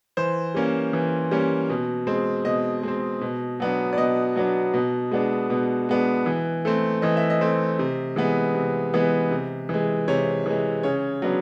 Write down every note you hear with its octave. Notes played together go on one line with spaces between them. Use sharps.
E3 C5
G3 A#3 C#4
E3
G3 A#3 C#4
B2
G#3 C4
B2 D#5
G#3 C4
B2
F#3 B3 D4
D5
B2 D#5
F#3 B3 D4
B2
G#3 B3 D4
B2
G#3 B3 D4
E3
A3 C4
E3 D#5
E5
D#5
A3 C4
C3
E3 G#3 B3
C3
E3 G#3 B3
C3
E3 G#3
C3 C#5
E3 G#3
C#3 C#5
F#3 B3 D4